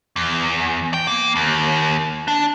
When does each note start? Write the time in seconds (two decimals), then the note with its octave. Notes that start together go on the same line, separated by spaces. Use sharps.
0.16 E2
0.94 G5
1.07 A#3
1.36 D#2
2.28 D4